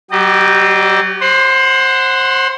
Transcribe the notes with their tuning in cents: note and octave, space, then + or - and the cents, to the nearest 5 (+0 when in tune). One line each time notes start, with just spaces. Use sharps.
F#3 +35 G4 +0 D#5 -35
C5 +25 F#5 +0 C6 -20